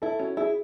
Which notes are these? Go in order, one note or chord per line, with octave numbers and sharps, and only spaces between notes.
E4 A4
C#4 F#4
E4 G#4